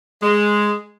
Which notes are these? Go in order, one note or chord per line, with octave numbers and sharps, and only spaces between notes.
G#3